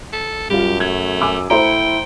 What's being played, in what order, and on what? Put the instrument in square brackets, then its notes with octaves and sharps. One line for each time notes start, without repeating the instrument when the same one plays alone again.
[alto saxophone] A4
[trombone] F#2 [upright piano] G3 F4 [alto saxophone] G4
[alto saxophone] A3 [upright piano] G#6
[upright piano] G#5 D6 E6
[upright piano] A3 C5 A#5 [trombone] E4 [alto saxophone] G5